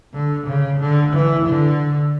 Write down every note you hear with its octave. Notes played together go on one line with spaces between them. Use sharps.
D3
C#3
D3
E3
D3